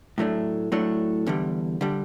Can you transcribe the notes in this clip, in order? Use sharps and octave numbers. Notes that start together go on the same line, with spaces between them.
A2 F#3 A3 D4
A2 F#3 A3 D4
E2 D3 G3
D3 G3